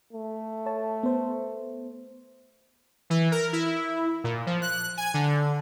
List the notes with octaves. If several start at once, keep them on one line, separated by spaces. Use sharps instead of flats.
A3
C#5 A5
B3 C5
E3
A#4
E4
A#2
F3
F#6
G#5
D3